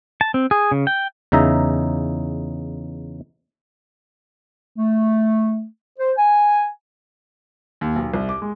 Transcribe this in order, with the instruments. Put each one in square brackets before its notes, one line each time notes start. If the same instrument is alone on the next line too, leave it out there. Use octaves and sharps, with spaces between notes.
[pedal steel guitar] A5
C4
G#4
C#3
G5
[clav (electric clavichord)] E2 C#3 D#4 E5 A#5
[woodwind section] A3
C5
G#5
[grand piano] D#2
B1
C2
D6
G#3